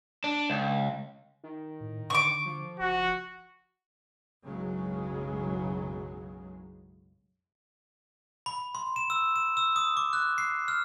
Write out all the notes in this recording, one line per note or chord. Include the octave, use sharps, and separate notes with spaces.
D4
C#2
D#3
A2
D3 C#6 D6
F3
F#1 F#4
F#1 B1 C#3 F#3 G#3
B5
C6
E7
E6
E7
E6
D#6
D6
F#6
C7
F6